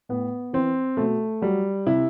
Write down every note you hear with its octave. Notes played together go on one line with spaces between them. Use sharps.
A2 B3
E3 C4
B2 A3
F#3 G3
C3 E4